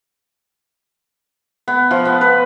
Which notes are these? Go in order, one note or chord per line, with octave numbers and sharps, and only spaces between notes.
B3
F3
B3
B4